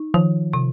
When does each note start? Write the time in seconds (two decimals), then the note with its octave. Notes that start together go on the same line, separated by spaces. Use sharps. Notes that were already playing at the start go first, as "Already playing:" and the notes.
Already playing: D#4
0.14 D#3 F3
0.53 C3